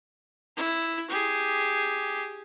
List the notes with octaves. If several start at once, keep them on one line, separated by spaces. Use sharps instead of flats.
E4
G4 G#4